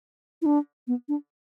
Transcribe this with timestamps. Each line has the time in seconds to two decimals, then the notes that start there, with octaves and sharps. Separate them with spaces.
0.42 E4
0.46 D4
0.88 B3
1.09 D4